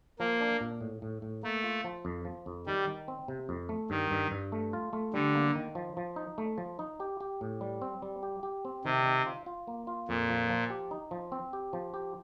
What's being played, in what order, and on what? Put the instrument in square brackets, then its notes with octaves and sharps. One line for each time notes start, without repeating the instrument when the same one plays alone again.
[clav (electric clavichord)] F3 [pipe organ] A#3
[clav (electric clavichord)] D4
A#2
A2
A2
A2
[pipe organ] A3 [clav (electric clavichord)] A#3
[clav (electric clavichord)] F4
F3
F2
F3
F2
[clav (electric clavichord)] D#3 [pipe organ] G3
[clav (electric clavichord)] D#3
C4
C3
F2
A3
[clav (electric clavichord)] G2 [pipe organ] D#3
[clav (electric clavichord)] G2
G2
A3
F4
A3
[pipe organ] D3 [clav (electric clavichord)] G3
[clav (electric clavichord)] A#3
D#3
F3
F3
D#4
A3
F3
D#4
G4
G4
A2
G3
C4
G3
G4
G4
C4
[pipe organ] C3 [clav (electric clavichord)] D#3
[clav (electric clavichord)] D#3
F4
F4
A#3
F4
[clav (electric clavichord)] F2 [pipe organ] A#2
[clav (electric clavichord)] F3
F3
G4
D#4
F3
C4
G4
F3
G4